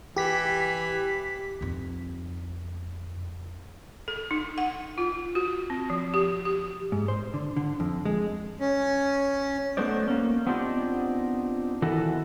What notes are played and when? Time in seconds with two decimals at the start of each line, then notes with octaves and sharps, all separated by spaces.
0.16 E3 G4 B6
1.61 F2 D#4
4.08 A4
4.31 D#4
4.58 F#5
4.98 F4
5.35 F#4
5.70 C4
5.90 F3
6.14 G4
6.45 G4
6.92 G#2
7.08 C5
7.34 D3
7.57 D3
7.80 F2
8.05 G#3
8.60 C#4
9.77 F#3 A3 B3 D#4 C5 D5
10.08 A#3 C#4
10.47 B3 C4 D4 D#4 F4 G4
11.82 D#3 E3 F#4 A4